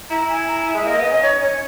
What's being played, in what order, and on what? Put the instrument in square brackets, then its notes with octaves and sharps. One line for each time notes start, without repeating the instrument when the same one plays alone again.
[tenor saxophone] E4 [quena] A#5
[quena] G#5
A#5
G#5
[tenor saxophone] G#3 [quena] E5
[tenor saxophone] A#3 [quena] D#5
[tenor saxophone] B3 [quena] D#5
[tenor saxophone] C#4
[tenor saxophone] D#4 [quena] C#5
[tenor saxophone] C#4 [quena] C#5